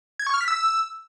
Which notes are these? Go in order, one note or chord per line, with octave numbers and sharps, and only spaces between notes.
G#6
C#6
F6
B6
E6